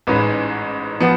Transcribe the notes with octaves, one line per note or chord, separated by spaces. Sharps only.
A1 G#2 G#3 C#4 B4
F3 B3